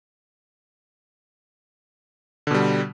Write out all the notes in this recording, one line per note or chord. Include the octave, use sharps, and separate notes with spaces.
B2 D3 G3